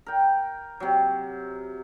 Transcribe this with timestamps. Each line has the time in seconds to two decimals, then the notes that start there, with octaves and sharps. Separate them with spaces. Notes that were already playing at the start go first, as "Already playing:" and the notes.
0.06 A#4 G5
0.80 C3 F#3